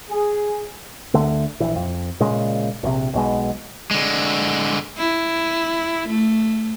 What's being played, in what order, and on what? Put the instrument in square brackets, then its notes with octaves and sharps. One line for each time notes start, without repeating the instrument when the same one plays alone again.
[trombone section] G#4
[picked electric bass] D2 D3 A3
A#1 E3
F2
A#2 C#3 G#3
A#1 C3
B1 B2 G#3
[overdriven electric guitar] D3 G#3
[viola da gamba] E4
A3